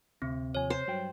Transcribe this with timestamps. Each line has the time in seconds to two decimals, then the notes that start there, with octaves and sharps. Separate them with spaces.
0.22 D2 C3 C4
0.55 D#2 F3 C#5 G#5
0.70 C5
0.88 G2 F#3 G5